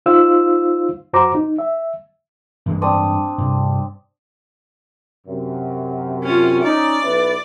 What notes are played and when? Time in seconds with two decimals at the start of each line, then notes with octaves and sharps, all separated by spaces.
0.06 D#4 F4 C5 F5 E6
1.13 F#2 F#4 C5 A#5 D6
1.35 D#4
1.59 E5
2.66 G2 E3 G#3
2.82 C4 D4 D#6
3.38 G2 C3
5.26 F#2 C3
6.23 C#4 F4
6.62 C#4 D#4 D5
7.03 B1 E4 B4